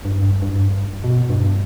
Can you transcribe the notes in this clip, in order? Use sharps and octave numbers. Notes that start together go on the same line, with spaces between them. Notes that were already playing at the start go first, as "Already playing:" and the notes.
G2
G2
B2
G2